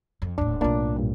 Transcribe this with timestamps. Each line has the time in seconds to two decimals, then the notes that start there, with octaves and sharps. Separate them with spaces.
0.22 F2
0.38 D#1 A2 D4
0.61 B1 A2 A#3 D4 F4
0.96 G2 A#2